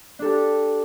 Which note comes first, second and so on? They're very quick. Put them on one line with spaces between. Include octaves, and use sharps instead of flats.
D4 A4 G4